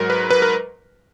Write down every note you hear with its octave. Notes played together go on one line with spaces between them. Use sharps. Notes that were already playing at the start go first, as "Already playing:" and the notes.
Already playing: G#2 F#3 A#4
B4
B4
A#4